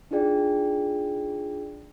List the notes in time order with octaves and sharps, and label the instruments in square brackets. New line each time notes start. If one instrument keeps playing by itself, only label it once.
[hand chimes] D4 D#4 F4 G#4 D5 G5